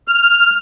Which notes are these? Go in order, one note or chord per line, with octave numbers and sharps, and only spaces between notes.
F6